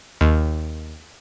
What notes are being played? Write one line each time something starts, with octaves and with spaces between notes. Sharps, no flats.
D#2